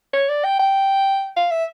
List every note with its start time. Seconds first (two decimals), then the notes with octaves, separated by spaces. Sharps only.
0.13 C#5
0.29 D5
0.44 G5
0.59 G5
1.36 F5
1.51 E5